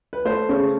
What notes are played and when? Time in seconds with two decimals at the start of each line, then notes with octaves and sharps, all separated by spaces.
0.13 B4
0.25 A3 C5
0.49 C#3 C#5